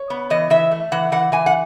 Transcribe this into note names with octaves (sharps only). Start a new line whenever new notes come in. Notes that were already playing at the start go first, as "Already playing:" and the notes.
Already playing: C#5
B3
E3 D#5
E3 E5
A3
E3 F#5
E3 F#5
E3 G#5
F#5